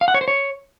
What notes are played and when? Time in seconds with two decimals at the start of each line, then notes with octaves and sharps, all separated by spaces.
0.01 F5
0.08 F#5
0.14 C#5
0.21 C5
0.28 C#5